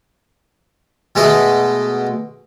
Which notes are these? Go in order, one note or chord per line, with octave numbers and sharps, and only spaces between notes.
B2 G#3 A3 D#5